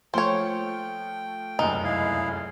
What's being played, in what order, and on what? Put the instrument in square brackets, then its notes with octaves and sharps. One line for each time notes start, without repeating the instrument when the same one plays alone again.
[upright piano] F3 A3 [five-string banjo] C5 C#5 [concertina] G5
[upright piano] F1 C#2 F#2 [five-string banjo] D#4
[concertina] E4 G#4 F5